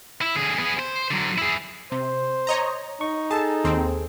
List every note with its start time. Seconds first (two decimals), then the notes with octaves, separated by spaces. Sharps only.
0.21 E4
0.36 D3 G#4
0.59 B3 G#4
0.79 C5
1.10 D3 F#3
1.38 E4 G#4
1.92 C3 C5
2.47 C#5 D#5 A#5
3.01 D#4 C#6
3.31 G#4 A4 A5
3.64 D#2 C4